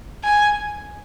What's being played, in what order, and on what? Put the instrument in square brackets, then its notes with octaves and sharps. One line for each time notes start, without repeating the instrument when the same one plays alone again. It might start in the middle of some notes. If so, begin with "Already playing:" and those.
[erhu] G#5